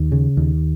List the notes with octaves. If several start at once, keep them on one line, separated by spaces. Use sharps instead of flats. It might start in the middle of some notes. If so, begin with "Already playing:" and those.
Already playing: D#2
C#3
D#2